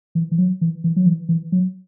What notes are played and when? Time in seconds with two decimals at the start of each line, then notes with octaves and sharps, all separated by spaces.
0.15 E3
0.31 E3
0.38 F#3
0.61 E3
0.84 E3
0.96 F#3
1.06 E3
1.29 E3
1.52 F#3